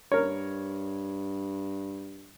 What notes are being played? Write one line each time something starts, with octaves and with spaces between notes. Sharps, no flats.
G2 A#4 C#5